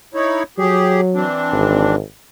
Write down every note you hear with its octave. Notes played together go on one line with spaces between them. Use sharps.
D#4 E4 C#5
F#3 G4 G#4
E3 C4 D4
G#1